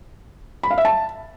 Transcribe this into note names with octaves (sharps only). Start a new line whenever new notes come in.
B5
F5
E5
A5